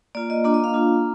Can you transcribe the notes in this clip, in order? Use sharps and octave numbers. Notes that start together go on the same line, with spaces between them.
A#3 F4 D5
D#5
A#3 D4 F4 D#5
D#5
F5
A#3 D4 F4